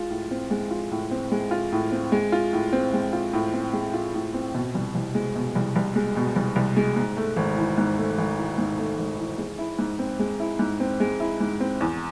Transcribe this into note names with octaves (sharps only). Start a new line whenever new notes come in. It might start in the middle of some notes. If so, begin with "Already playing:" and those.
Already playing: G#3 F4
A2
C4
G#3
F4
A2
C4
G#3
F4
A2
C4
G#3
F4
A2
C4
G#3
F4
A2
C4
G#3
F4
A2
C4
B2
C2
C2
G#3
B2
C2
C2
G#3
B2
C2
C2
G#3
G#2
A3
G#1
E3
G#2
A3
G#1
E3
G#2
A3
G#1
E3
G#3
E4
G#2
C4
G#3
E4
G#2
C4
G#3
E4
G#2
C4
E2